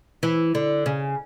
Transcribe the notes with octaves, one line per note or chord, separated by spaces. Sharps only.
E3
D3
C#3